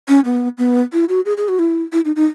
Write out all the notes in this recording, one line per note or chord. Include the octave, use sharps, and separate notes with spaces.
C#4
B3
B3
E4
F#4
G#4
G#4
F#4
E4
E4
D#4
D#4